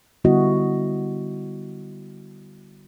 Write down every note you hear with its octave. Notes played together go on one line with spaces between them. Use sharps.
D3 G3 B3 E4 F#4 D#5